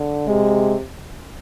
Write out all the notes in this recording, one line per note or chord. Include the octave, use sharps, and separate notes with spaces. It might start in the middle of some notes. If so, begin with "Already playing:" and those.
Already playing: D3
C3 G#3